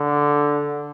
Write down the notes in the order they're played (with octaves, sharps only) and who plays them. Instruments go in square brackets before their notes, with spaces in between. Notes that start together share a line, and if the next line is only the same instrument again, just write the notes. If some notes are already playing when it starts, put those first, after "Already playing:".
Already playing: [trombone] D3